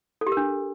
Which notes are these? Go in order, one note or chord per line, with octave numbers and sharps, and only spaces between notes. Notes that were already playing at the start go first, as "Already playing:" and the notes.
A4
G4
A#4
D4